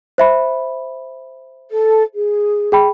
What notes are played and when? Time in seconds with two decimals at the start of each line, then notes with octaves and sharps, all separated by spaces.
0.18 C5 E5 B5
1.70 A4
2.15 G#4
2.72 G#4 G5 B5